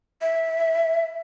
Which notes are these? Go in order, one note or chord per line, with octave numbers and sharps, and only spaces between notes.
E5